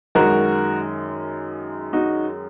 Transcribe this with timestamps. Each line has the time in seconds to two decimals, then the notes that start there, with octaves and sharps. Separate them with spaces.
0.15 F#2 D#3 G#3 F#4 A#4
1.93 D#4 F#4